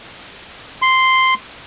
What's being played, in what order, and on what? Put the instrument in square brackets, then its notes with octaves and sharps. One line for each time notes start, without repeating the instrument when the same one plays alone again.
[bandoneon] C6